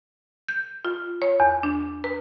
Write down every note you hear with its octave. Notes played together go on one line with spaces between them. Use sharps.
G6
F4
C#5
E2
D4
B4